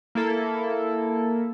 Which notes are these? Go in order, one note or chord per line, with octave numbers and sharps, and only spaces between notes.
A#3 E4 A4